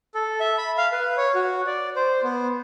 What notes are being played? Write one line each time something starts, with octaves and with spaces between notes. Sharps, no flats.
A4
E5
B5
F5
B4
C#5
F#4
D5
C5
B3